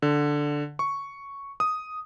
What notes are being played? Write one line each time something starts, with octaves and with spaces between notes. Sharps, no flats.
D3
C#6
D#6